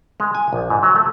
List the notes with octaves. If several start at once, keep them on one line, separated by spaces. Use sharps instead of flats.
G#3
G#5
A#1
G#2
F#3
A3